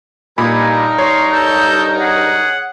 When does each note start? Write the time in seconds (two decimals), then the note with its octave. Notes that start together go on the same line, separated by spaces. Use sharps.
0.38 G2 A#2 D#4 A#4 G#5 B5
0.98 C#5 C6
1.33 A4 G6
2.01 G#4 F#5